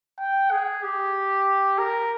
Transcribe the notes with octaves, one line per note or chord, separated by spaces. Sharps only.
G5
G#4
G4
A#4